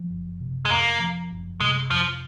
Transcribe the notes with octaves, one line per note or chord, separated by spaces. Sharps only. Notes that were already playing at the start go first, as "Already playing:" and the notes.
Already playing: F3
F#1
C3
G#3
F2 A#3
F3
F#1
C3 G#3
F2 F3